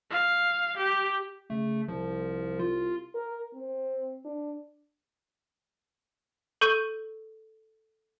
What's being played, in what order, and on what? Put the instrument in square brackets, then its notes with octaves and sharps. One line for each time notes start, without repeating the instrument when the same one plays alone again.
[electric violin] F5
G4
[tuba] C#3 [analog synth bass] A3
[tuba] C2 [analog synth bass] F3
[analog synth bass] F4
[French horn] A#4
C4
D4
[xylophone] A4 C#6 G6 D#7